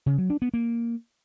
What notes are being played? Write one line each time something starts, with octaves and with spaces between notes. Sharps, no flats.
C#3
F#3
D4
B3
A#3